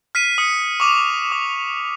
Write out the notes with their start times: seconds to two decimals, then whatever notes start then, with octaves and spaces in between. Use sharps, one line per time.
0.15 F6 B6 C7 D#7
0.38 D#6 C#7
0.80 C#6 D6 D#7 F7
1.32 D6